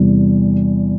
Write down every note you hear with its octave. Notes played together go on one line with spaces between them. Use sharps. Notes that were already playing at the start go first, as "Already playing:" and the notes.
Already playing: E2 C3 G3